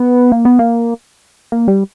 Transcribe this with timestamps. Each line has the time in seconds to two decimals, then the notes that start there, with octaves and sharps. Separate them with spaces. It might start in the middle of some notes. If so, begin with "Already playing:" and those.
Already playing: B3
0.32 A#3
0.45 B3
0.59 A#3
1.52 A#3
1.68 G3